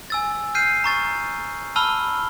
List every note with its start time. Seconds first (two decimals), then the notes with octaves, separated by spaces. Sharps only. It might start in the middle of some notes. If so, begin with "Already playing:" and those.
0.10 G#5 E6 A6
0.55 F6 G6 C7 D#7
0.84 A#5 C#6 A6
1.76 A5 B5 E6 F6 G7